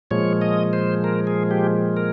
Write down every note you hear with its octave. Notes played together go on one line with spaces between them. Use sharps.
A#2 F3 G#3 C#5
D#5
C5
A#4
G#4
G4
A#4